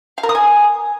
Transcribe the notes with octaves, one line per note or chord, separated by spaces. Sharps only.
F5
A#4
D#6
G#5